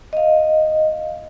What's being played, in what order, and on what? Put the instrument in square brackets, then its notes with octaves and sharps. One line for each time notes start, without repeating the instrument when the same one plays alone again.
[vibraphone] D#5 F5